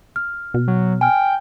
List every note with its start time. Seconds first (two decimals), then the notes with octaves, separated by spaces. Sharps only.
0.16 F6
0.54 B2
0.68 F#3
1.01 G5 G#5 F6